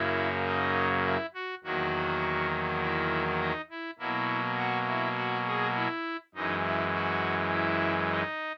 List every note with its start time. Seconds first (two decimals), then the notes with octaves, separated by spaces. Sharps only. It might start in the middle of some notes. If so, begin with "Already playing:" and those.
Already playing: F#2 C#3 F#3 A#3 E4
0.46 D#4
1.05 E4
1.34 F#4
1.64 E2 D#3 F#3 A#3 F#4
2.81 E4
3.41 D#4
3.70 E4
3.99 B2 F#3 A#3 E4
4.58 F#4
4.88 E4
5.17 F#4
5.47 G#4
5.75 E4
6.35 F#2 E3 G#3 D#4
6.64 E4
6.94 F#4
7.52 E4
8.11 D#4